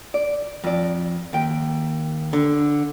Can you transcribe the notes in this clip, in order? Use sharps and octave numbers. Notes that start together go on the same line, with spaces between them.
D5
F2 D5
D#2 G5
D3